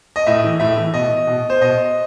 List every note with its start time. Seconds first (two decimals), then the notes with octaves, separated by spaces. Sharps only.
0.16 D#5
0.27 A2 E5
0.44 E3
0.60 A2 E5
0.77 E3
0.94 B2 D#5
1.27 B2
1.50 C5
1.61 B2 D#5